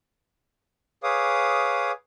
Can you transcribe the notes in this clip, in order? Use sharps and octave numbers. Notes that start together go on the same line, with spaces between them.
G#4 B4 C#5 F5 D6 D#6